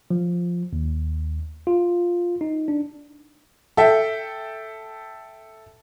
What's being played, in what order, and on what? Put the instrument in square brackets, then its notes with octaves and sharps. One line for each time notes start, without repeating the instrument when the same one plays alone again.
[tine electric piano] F3
D#2
F4
D#4
D4
[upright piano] A4 E5 G5